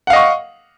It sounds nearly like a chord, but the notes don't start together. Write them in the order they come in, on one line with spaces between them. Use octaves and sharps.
F#5 F5 D#5 C#6